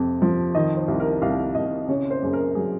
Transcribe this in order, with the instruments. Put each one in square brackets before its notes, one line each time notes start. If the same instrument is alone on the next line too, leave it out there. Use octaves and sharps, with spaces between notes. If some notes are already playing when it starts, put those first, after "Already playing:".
Already playing: [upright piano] F2 C3
F3
D#3 D#5
C5
C2
A#4
C2 F5
C2 D#5
C#3 C#5
C5
F#2 G#4
A#4
F#3 G#4